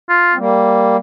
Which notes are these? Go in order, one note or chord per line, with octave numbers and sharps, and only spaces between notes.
F4
C4
G3 A#3